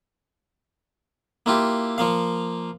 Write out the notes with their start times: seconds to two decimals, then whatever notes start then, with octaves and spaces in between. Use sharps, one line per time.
1.46 A#3 E4 F4 G4
1.98 F3 A#3 F5